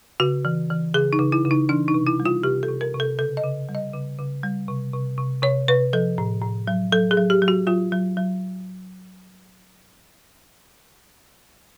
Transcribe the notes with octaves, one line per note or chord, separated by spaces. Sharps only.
C#3 F#4
E3
E3
C#3 G#4
D#4
C#3
E4
C#3
D#4
E3 D4
D#4
C3
E4
G3
F4
C3 G4
A4
C3
A#4
C3
A4
C#3 A4
D#5
C#3
G3
D#5
C#3
C#3
G3
C3
C3
C3
C3 C#5
C3 B4
F3 A4
A2
A2
F#3
F#3 A4
G#4
F#3
G4
F#3
F#4
F#3 F4
F#3
F#3